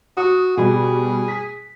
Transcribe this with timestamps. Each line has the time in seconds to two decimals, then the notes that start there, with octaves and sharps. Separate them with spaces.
0.17 F#4 D#6
0.57 B2 G3 G#4
1.28 B6